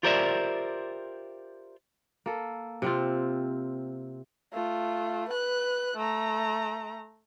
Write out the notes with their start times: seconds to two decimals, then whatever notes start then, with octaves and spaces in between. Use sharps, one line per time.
0.03 F4 G4 A#4 C5 D5 E5
2.26 A#3 A4
2.82 C3 C4 F4
4.53 A3 F4
5.29 B4 F#6
5.97 A3 A#5